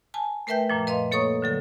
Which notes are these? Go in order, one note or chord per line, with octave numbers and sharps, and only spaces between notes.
G#5 A5
A3 A#4 B4 E5 G5 G6
F#2 A#2 F3
B4 D#5 F5 C6
A#3 A4 C#5 C#6 D#6
D3 F#3 A4